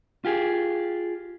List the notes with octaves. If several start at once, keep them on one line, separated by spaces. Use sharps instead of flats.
F4 G4 G#4